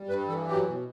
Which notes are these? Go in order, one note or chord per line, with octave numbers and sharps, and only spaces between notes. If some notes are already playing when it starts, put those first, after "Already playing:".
Already playing: G3
G2 B4
E3 A4
F#3 G4
B2